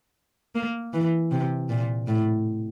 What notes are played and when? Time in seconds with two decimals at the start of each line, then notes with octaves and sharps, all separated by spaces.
0.55 A#3
0.93 E3
1.31 C3
1.70 A#2
2.07 A2